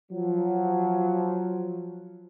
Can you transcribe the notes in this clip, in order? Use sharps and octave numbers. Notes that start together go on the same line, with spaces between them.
F3 F#3